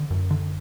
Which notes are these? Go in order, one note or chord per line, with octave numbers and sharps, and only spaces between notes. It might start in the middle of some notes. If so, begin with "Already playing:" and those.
Already playing: D3
F#2
D3